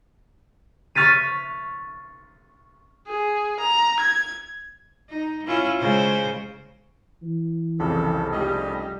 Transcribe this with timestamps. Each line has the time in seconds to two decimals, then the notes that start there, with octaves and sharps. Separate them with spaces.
0.95 C#6 F6 A6 B6 D#7
3.08 G#4
3.60 A#5
4.00 G#6
5.10 D#4
5.47 C#4 E4 F4
5.79 C#3 G#3 C5
7.23 E3
7.79 C2 F2 C#3 A4
8.32 F1 G3 D#5